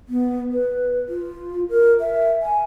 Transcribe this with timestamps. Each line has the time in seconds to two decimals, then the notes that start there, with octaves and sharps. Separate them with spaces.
0.09 B3
0.52 B4
1.09 F4
1.69 A#4
2.00 E5
2.42 G#5